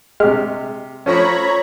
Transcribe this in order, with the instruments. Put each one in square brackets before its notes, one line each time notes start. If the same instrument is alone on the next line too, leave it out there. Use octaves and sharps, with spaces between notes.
[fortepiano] C3 G4 F6 [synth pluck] G#3
[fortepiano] F3 A3 C#4 [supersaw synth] C#5 A#5 B5